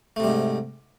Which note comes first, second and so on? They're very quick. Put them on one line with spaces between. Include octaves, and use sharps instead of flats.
A3 C3 G3 G#2